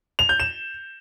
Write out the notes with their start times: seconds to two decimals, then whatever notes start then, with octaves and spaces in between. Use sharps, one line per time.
0.19 F7
0.29 G6
0.40 E7